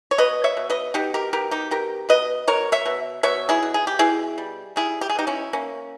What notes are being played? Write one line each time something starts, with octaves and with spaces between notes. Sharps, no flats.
C#5
B2 B4 D#5
C#5 E5
B2
B4 D#5
B2 D#4 G4
G4 A#4
B2 G4 A#4
D#4 G4
B2 G4 A#4
B2 B4 D#5
B2 A#4 C#5
C#5 E5
B2
B2 C#5 E5
E4 G#4
B2
G#4
G4
B2 E4 G#4
G3
G3 E4 G#4
G4
G#4
B2 D#4 G4
C#4 E4
A#3 C#4